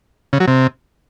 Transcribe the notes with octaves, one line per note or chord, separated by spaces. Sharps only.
C#3
F#3
C3